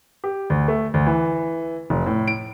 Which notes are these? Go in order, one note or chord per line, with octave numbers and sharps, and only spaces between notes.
G4
D2
A3
D2
E3
F1
A2
D7